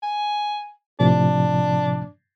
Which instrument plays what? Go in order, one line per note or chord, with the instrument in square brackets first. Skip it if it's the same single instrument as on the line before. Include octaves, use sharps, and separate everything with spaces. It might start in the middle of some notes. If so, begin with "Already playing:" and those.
[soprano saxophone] G#5
[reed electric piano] A2 C3 F3 [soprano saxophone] D4